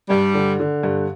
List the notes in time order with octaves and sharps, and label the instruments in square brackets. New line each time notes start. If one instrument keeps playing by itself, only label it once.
[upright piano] G2 [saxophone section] G3
[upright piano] D3
D3
G2